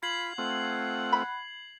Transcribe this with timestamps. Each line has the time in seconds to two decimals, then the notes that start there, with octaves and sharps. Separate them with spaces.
0.03 F4 B5 G#6 C7 F#7
0.38 A3 C4 F4 F#5
1.12 B5